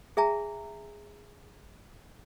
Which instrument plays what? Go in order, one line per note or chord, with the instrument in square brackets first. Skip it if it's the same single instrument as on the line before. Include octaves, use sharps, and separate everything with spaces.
[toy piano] G#4 E5 G#5 A#5